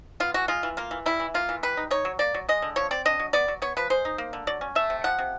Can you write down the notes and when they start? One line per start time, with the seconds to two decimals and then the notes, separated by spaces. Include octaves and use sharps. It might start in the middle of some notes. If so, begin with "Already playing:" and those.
0.20 B3 F4
0.34 E3 F#4
0.48 G#3 F4
0.63 E3
0.77 A#3 F4
0.91 E3
1.06 G3 E4
1.20 E3
1.34 A#3 F4
1.49 E3
1.63 G3 B4
1.77 D#4
1.91 D#4 C#5
2.05 F#3
2.19 A#3 D5
2.34 F#3
2.49 G#3 D#5
2.62 D3
2.76 F3 C#5
2.91 C4 D5
3.05 D4 D#5
3.20 F#3
3.33 B3 D5
3.48 F#3
3.62 B3 C#5
3.77 F3 B4
3.90 G#3 C5
4.05 D#4
4.18 A#3
4.33 D3
4.47 F#3 D5
4.61 C#4
4.75 A3 E5
4.90 C3
5.04 F3 F#5
5.19 C3